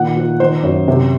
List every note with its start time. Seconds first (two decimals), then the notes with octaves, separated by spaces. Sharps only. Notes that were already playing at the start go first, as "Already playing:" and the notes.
Already playing: A#2 D#3 F#5
0.17 F3
0.40 D#3 C5
0.63 F#2
0.88 C3